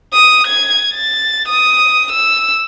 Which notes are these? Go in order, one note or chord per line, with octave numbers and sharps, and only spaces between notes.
D#6
G#6
A6
D#6
E6